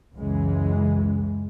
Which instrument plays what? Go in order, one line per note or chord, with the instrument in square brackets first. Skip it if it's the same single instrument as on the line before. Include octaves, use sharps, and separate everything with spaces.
[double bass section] C#2 F#2 C#3 E3 G#3